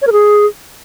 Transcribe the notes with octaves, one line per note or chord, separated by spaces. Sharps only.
C#5
A#4
G#4